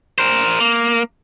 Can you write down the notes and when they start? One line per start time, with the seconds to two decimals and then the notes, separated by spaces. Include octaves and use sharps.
0.18 A#4 C5
0.60 A#3